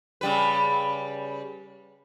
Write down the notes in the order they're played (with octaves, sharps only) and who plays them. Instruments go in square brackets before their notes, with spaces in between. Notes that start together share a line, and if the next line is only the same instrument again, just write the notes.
[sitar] C#3 G3 B4